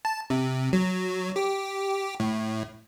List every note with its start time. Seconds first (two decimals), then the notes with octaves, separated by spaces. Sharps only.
0.05 A5
0.30 C3
0.73 F#3
1.36 G4
2.20 A2